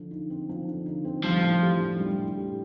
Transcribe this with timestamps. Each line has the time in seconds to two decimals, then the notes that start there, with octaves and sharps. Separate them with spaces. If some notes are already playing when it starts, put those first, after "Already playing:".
Already playing: D3 F3
0.11 D#4
0.30 C4
0.49 F3
0.68 D3
0.86 D#4
1.05 C4
1.23 F3 G3
1.43 A2
1.62 G4
1.80 D4
1.99 G3
2.18 A2
2.37 G4